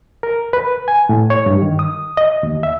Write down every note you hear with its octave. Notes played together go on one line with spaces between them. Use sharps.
A#4
B4
G#5
A2
C#5
G2
D#3
D#6
D#5
D#2
E5